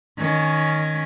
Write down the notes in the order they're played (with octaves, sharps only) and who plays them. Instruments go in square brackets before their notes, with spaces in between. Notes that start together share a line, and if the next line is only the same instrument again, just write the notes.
[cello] D#3 C#4